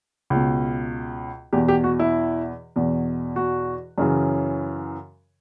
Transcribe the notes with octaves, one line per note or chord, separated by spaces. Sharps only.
C#2
B2
E2 B2 G4
G4
F#4
E4
E2 B2
F#4
F#2 C#3 E3